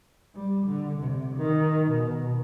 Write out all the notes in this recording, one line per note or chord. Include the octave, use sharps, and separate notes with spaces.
G3
D3
C3
D#3
B2